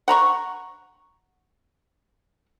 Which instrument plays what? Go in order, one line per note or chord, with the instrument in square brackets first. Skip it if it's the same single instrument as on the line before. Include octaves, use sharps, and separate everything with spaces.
[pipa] F#5 A#5 B5 C#6